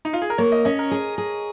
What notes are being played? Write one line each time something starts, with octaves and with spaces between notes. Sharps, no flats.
D#4
F4
G#4
A#4
A#3 C#5
D#5
C#4 D#5
A#4
G#4
G#4